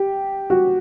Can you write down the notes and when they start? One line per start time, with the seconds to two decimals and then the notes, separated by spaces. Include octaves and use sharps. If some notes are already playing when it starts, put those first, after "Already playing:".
Already playing: G4
0.50 F#4